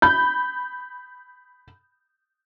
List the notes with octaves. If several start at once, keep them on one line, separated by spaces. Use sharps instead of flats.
B5 G6